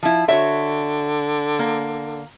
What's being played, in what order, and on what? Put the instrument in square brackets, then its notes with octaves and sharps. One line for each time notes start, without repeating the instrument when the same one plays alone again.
[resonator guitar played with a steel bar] F3 E4
[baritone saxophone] D3 [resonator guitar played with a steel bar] F#4 C#5 E5
[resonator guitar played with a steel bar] A#3